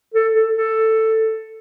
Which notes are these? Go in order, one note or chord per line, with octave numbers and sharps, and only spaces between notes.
A4
A4
A4